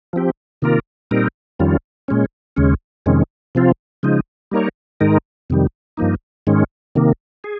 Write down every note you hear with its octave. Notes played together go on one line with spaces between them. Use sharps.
F3 C4 G4
C3 D#3 A#3 F4 A#4
A#2 G3 C4 D#4 A#4
F2 D#3 G3 C#4 F4
A#2 G#3 C#4
D#2 C#3 G#3 C#4
F2 C3 D#3 G#3 C#4
C3 F3 C4 F4
C#3 F3 G#3 D#4
G3 A#3 D#4 A#4 C#5
G#2 D#3 G#3 D#4 A#4
F2 C3 D#3 G3
G2 F3 A#3 D#4
G#2 D#3 G#3 C#4
C3 D#3 A#3
G#4